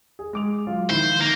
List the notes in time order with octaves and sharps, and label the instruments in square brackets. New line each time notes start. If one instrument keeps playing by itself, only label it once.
[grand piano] G#4
G#3 D6 F7
F#3 F4
[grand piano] D#3 F3 E4 [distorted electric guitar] C5
[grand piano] D#3 [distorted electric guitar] A#3